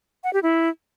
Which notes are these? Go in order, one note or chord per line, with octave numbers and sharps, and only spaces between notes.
F#5
G4
E4